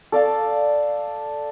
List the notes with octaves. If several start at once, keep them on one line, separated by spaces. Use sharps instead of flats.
A4 D5 F5 A5